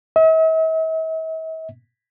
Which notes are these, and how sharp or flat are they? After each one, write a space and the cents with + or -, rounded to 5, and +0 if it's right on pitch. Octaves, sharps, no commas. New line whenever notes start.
E5 -45